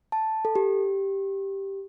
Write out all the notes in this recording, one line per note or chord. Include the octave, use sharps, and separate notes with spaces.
A5
A4
G4